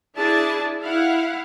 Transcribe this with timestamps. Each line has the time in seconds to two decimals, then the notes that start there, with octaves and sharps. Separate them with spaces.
0.18 D4 E4 G#4 A5
0.82 E4 F5 F#5